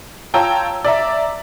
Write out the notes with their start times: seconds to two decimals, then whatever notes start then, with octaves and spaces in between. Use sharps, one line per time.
0.34 F4 C#5 G5 A5 A#5 E6
0.85 D5 E5 A#5